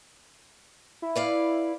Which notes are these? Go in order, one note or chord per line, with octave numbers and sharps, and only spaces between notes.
E4
B4 D5 F5